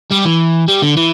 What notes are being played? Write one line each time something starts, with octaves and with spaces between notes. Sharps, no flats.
G3
E3
G3
D3
E3